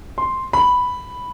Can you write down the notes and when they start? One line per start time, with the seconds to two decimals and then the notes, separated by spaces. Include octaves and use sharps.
0.18 C6
0.53 B5